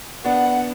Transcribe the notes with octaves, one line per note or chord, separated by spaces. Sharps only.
B3 D4 F#5